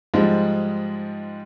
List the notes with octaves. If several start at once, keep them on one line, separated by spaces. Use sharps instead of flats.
G#2 F3 G3 G#3